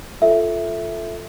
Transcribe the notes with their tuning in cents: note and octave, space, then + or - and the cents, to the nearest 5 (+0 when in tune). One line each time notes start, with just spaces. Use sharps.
F4 +0 A4 +0 E5 +0